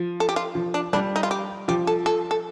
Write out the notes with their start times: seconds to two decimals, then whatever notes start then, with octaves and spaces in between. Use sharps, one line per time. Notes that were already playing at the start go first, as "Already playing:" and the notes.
Already playing: F3
0.20 A4
0.29 G4
0.36 F4
0.55 F3
0.74 D4
0.93 G3 D4
1.16 D#4
1.23 F4
1.31 G4
1.68 F3 G4
1.87 A4
2.06 A4
2.31 A4